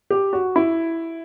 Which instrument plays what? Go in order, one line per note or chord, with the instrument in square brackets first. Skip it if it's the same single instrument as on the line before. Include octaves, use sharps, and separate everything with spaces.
[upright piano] G4
F#4
E4